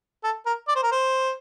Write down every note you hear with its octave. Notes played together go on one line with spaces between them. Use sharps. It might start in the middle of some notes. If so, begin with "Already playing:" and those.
A4
A#4
D5
C5
A#4
C5